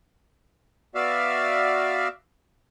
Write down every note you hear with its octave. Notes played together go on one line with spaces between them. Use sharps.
B3 F#4 D5 E5 F5